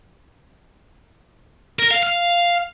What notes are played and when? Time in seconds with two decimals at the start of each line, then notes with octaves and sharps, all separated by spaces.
1.79 A#4
1.91 F5
2.03 F5